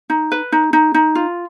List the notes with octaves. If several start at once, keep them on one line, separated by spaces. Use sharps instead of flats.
D#4
B4
D#4
D#4
D#4
F4